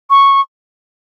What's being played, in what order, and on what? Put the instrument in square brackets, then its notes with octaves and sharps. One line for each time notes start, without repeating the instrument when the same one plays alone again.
[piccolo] C#6